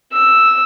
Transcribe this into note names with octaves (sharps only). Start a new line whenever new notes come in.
E6